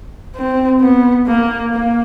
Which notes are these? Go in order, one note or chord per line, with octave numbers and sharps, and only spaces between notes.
C4
B3
A#3
A#3